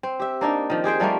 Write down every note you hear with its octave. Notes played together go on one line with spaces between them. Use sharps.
C4
G4 E5
A#3 D4 D#4
D#3 F3
G4 G#4 C5 G5
F3 G3 A3 A#3